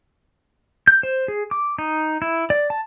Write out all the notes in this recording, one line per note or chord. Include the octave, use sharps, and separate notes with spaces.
G6
C5
G#4
D6
D#4
E4
D5
A5